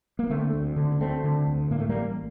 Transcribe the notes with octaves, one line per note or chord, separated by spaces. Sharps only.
A#3
D3 A3 C4
D2
D3
D4
D2 A3 C4
D3
D2
A2 A#3
A3
A1 G3 A#3